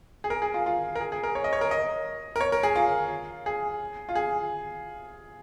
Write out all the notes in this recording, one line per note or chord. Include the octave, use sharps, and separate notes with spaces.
G#4
A#4
G#4
F4
F4
A#4
G#4
G#4
A#4
C#5
D#5
C#5
A#4
D#5
A#4
C#5
A#4
G#4
F4
G#4
F4
G#4